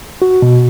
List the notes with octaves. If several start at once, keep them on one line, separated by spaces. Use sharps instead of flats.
F#4
B2